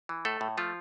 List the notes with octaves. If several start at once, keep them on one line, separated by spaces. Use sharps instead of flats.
E3
A2 A3 A4
A2
F3 A3 F4